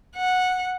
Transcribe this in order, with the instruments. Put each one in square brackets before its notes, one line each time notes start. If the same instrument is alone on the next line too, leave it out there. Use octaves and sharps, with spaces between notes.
[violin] F#5